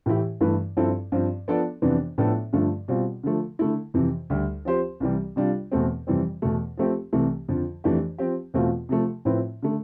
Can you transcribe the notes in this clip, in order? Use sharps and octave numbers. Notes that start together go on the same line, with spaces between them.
A2 E3 A3 E4 G4
G2 E3 A3 E4 B4
G2 F3 C4 E4 A4
G2 F3 C4
F3 B3 D4 A4 D5
F2 C3 E3 B3 D4
A2 F3 B3 D4 A4
G2 D3 F3 A3
B2 G3 C4 F4
D3 F3 A3
D3 A3 E4
F2 C3 E3
D2 D3 G3
F3 C4 G4 C5
C2 C3 E3 G3
C3 G3 D4 F4
E2 B2 A3 C4
F2 C3 E3 G3 C4
E2 B2 A3
F3 A3 C4 G4
C2 C3 E3 A3
F2 D3 F3
F2 E3 A3 D4 G4
F3 C4 G4
E2 B2 A3 C4 F4
C3 F3 A3
A2 F3 C4 E4 B4
D3 A3